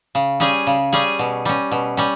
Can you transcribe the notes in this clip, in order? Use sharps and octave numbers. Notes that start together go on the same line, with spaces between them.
C#3
G3 C#4 G#4
C#3
G3 C#4 G#4
B2
G3 C#4
B2
G3 C#4